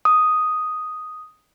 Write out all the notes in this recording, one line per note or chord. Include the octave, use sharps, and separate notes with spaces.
D#6